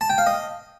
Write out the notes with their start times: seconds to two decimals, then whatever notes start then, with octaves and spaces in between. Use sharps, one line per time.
0.01 A5
0.10 G5
0.18 F5
0.27 D#5